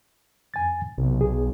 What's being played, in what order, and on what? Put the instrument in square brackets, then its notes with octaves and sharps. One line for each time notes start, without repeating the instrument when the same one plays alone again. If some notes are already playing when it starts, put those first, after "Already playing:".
[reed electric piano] F2 G#5 A6
[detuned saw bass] B1 [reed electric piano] C3
[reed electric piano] G#4